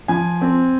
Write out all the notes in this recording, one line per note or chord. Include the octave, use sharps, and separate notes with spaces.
F3 G#5
C4